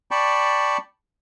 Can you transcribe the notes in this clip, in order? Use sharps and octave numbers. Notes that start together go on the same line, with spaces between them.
D5 G5 A5 B5 C#6